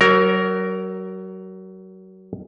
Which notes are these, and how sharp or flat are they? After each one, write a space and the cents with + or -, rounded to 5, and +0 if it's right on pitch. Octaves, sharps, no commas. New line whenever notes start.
F#3 +30 A#4 +0 C#5 -25